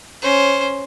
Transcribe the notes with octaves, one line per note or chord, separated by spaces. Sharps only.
C#4 C5